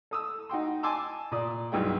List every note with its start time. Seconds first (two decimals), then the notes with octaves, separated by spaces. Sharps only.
0.11 A4 D#6 E6
0.49 D#4 F#4 G5 C6
0.83 G#5 A5 C6 D6 E6
1.31 A#2 D5 D#6
1.72 B1 G2 E4 G#4 G5